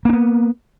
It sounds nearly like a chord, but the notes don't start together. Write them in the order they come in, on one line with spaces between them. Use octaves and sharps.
A#3 D4 B3